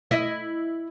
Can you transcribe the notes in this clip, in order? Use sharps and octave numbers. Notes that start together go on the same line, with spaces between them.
E4 D#5 E5